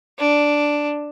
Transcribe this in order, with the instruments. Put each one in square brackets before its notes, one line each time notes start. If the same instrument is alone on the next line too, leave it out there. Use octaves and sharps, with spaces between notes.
[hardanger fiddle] D4